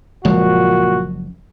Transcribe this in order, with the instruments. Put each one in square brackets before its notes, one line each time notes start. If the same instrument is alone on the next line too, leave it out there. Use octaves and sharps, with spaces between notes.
[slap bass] F#1 F3 G#3 [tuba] A#2 [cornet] F#4